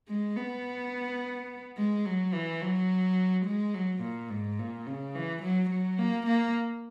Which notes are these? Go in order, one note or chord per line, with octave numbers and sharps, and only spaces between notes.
G#3
B3
G#3
F#3
E3
F#3
G#3
F#3
A#2
G#2
A#2
C#3
E3
F#3
F#3
A#3
A#3